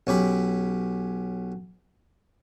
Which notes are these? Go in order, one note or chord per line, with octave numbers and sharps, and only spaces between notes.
B1 C#4 G4 B5